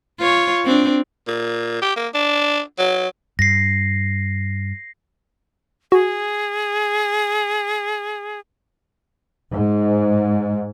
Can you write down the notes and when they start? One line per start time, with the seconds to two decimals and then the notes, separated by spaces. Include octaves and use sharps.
0.19 F4 C#5
0.65 C4 D4
1.28 A#2
1.82 G4
1.96 A#3
2.15 D4
2.79 F#3
3.39 G2 A#6 C7
5.92 F#4 G#4
9.52 G#2